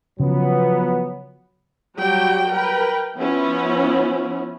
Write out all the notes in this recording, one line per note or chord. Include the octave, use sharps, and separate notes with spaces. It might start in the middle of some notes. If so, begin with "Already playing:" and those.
C#3 F3 F#3 B3
F#3 G3 F#4 G4 G5
A#4 B4 G5
F3 B3 C#4 E4